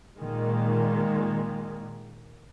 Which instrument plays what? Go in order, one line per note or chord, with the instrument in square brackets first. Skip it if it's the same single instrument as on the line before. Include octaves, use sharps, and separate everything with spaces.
[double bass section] A#2 D#3 G#3